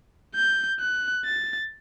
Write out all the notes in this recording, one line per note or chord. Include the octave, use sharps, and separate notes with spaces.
G6
F#6
A6